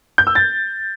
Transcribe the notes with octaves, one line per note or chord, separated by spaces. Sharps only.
G6
E6
A6